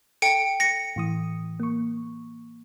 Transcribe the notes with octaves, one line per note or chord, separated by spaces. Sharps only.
A4 G5 C#7 D7
A#6 C#7
A2 E3 D#6
A#3 C#6